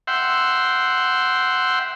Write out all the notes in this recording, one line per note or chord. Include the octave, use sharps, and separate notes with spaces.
E5 F#5 G5 C6